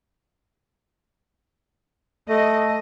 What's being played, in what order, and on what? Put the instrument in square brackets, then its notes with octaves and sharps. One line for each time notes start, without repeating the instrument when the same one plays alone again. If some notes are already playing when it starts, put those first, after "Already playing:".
[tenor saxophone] A3 [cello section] D#5